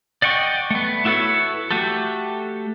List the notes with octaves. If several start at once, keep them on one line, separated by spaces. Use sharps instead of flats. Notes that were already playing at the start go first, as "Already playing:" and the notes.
D5 D#5 F#5 G5 C#6
A3 B3
E4 F#4 A4 B4 C#5
A3 F#4 G4 A4